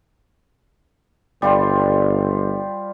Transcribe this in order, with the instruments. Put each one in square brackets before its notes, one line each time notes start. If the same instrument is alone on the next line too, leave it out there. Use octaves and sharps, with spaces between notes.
[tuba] G1 [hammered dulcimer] G3 F4 C5